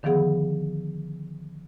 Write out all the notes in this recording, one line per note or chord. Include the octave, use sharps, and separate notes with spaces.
D3 D#3 F3 B3 G#4 F#5